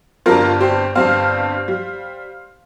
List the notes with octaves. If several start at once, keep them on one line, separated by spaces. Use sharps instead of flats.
G1 G2 G3 C4 F4 A#4
G4 C5
G1 G2 G3 C4 C5 F5
G3